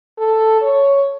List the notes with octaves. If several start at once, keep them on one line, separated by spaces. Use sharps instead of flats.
A4
C#5